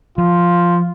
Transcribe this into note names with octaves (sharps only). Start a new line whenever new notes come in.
F3 F4